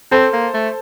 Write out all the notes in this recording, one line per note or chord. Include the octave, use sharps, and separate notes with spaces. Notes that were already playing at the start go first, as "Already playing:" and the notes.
C4 A4 C5
A#3
A3